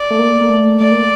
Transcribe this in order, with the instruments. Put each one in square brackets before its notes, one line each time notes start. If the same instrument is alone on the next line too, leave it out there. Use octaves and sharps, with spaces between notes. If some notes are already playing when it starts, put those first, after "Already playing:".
Already playing: [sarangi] D5
[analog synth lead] A3
A#3
A#3
A3
[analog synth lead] A3 [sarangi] D5
[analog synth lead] A#3